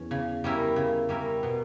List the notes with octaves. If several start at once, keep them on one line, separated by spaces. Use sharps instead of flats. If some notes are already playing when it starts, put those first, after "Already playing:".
Already playing: E2 C#4
C#3
G3 C#4 E4 A#4
C#3
G3 C#4 E4 A#4
B2